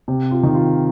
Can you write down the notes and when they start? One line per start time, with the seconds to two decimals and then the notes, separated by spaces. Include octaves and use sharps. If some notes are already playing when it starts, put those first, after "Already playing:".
0.08 C3
0.31 F4
0.43 D#3
0.55 F4